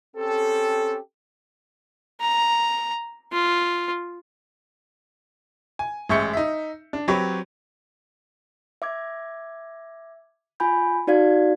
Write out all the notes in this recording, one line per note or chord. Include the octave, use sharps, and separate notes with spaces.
C4 C#4 G4 A4
A#5
F4
G#5
A1 G#3 E5 C#6 G6 C#7
D#4 E5
D4
F#3 C4 G4 B4 C#5
E5 D6 G#6
F4 G#5 B5 G6
D#4 F#4 D5 F5 G#6